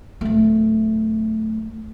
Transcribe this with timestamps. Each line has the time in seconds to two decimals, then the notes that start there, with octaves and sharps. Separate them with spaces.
0.21 D1 A3